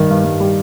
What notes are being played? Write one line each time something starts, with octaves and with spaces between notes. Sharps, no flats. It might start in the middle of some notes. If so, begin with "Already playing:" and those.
Already playing: G2 D#3 G3
G2
G2
G3